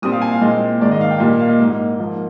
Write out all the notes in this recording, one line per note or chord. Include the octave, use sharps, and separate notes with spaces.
A#2 G3 C4 D#6
F5
G#5
F5
A#2 G#3 C4 D#5
G#2 D#3 G#3 D5
D#5
F5
G5
A#2 G3 A#3 D#5
F5
D#5
G#2 G3 A#3 D#5
G#2 F3 A#3